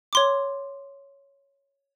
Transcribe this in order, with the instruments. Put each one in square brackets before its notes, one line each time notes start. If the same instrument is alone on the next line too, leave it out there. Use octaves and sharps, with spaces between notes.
[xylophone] C#5 C6 D6